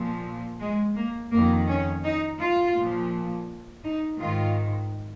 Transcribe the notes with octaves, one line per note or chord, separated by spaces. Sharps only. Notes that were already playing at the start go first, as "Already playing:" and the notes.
Already playing: A#2 F3
G#3
A#3
F2 D#3 A#3
C#4
D#4
F4
A#2 F3
D#4
G#2 D#3 F4